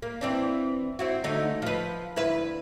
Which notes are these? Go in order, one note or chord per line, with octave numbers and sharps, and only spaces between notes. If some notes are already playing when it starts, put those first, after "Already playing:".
A#3
E3 C4 D4
C4 E4 F#4
D3 A3 D#4
F3 B4
D2 E4 B4